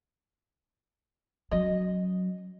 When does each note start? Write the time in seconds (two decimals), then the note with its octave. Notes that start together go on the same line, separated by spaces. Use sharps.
1.51 F#3 C#4 D#5